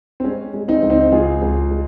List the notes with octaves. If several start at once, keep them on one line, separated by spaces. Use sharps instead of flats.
C4
G#3 C#4
G#3
C4 D#4
C#2
C4 D#4
C#2 F4 G#4
C#2
G#3